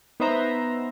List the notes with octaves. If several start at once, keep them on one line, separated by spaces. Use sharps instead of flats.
B3 D#4 B4 C5 E5 A#5